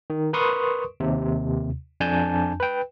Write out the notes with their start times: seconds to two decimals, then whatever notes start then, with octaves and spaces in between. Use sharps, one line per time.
0.10 D#3
0.33 A#4 B4 C6 C#6 D#6
1.00 D#2 C3
2.00 F2 D4 G#5 A5 G6
2.60 B4 G5